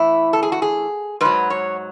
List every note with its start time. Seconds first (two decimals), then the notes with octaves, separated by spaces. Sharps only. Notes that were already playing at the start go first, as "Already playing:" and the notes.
Already playing: A2 E3 E4
0.33 A4
0.43 G#4
0.52 F#4
0.62 G#4
1.21 G#2 F#3 B4
1.50 C#5